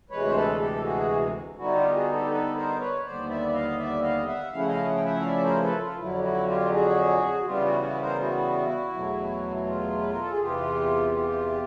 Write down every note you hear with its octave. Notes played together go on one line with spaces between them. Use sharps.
D2 C3 E3 G#3 B4 C#5
C5
A4 B4
G#4
G4 A4
G4
F#4 G#4
D3 G3 B3 D#4 E4 F#4
F4 G4
F#4 G#4
G4 A4
A4 B4
A#4 C5
B4 C#5
D#2 D3 G3 B3 C5 D5
D5 E5
E5
D#5 F5
D5 E5
D#5 F5
E5 F#5
C#3 F3 A3 C#4 E4 F5
F#5
D#5 F5
F#5
G5
E5 F#5
F5
D5 E5
A#4 C5
A4 B4
F4
F2 D3 F#3 E4
G4
E4 F#4
F4 G4
F#4 G#4
F#4
C#3 E3 G3 B3 F4 G4
E4 F#4
E4 F#4
B4
A#4 C5
E4 F#4
E2 B2 F#3 A3
F4
B4
A#4
A4
G#4
E2 C3 E3 F4 G4
F4 G4